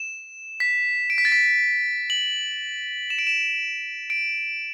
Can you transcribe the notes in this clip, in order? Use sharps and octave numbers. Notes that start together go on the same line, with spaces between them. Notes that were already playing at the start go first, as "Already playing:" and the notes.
Already playing: E7
B6
D7
B6
A6
B6
F#7
E7
D7
E7
D7